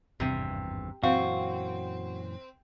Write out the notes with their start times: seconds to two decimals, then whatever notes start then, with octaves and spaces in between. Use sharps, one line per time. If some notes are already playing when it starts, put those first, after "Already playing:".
0.20 G#1 E2 G2 C3
1.03 F#2 A#2 E3 C4 F#4 F5